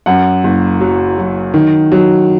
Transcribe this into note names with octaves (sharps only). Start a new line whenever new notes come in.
F#2 F#5
F#1
F#3
F#3
D#3
F#3